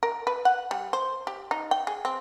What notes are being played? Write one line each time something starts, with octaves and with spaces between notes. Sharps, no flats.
A#4
B4
F#5
G3
C5
G4
D#4
G5
G#4
C4